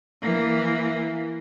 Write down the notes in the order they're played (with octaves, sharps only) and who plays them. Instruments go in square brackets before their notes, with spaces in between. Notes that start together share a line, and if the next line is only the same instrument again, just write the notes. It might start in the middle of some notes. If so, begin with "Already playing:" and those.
[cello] E3 A#3